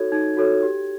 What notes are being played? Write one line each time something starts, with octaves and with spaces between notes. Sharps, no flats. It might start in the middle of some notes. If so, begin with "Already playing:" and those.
Already playing: D#4 F#4 A4 C#5 G#6
D#4 G#6
F#4 A4 C#5
G4